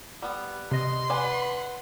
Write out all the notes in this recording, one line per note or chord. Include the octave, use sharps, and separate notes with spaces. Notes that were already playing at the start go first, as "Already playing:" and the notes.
G3 B3
C3 D#5 C6
B4 D5 F#5 G#5